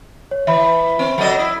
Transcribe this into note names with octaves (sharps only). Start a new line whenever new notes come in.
C#5
E3 E5 B5
C4
F#3 A4 D#5
E4